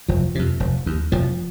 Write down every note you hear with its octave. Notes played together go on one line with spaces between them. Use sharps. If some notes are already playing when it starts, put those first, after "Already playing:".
F1 F3
F2 C3
F1
D#2
F1 F3